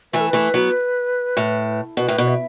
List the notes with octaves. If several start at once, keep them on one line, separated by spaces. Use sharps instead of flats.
E3 A3 B4
A4
E3 A3 B4
F#3 B3
A2
B2 B4
A2
B2
E5